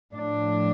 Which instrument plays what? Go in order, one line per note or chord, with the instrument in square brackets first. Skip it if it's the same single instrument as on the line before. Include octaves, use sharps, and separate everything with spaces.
[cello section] A2 F3 D4